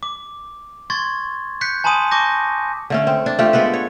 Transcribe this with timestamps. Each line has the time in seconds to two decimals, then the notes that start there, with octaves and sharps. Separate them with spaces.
0.03 D6
0.90 C6 C#6 G#6 A6
1.61 F#6 G6 B6 C#7
1.84 G#5 A5 B5 C6 D#6 D#7
2.11 A5 C#6 D6 G6 A#6
2.90 D3 A3 C#4
3.07 C4
3.26 D4
3.39 A3 F4 G4
3.53 G#3 B3 A4 B4
3.73 C#5